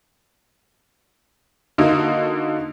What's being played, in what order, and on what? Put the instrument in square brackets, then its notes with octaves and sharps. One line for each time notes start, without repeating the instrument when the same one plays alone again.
[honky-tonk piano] D3 A#3 D#4 F#4